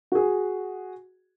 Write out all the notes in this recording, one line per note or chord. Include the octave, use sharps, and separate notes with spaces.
F#4 G#4